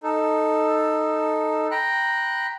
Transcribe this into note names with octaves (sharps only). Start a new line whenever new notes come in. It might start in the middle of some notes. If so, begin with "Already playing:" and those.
D#4 A4
G5 A#5 B5 F#6